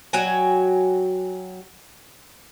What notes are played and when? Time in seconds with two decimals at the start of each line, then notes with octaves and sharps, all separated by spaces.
0.13 F#3 F#4 G5 G#5